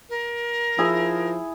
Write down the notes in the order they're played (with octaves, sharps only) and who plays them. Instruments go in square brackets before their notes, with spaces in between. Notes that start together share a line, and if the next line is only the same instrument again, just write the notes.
[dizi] A#4
[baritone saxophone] F3 [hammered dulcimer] E4 G#4